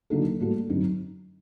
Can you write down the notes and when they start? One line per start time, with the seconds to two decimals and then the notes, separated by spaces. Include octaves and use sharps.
0.10 D3 F#3 A#3 D#4 A4
0.40 A2 G3 A#3 F#4 A4
0.69 F#2 D3 F#3 C4 D#4